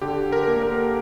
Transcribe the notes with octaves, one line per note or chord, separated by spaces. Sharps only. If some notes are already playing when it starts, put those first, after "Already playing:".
D3 G4
A#4
A#3
A#4